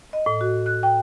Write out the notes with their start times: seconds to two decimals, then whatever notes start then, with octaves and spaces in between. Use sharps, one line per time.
0.13 D#5
0.26 A2
0.41 F#4
0.66 F#6
0.83 G5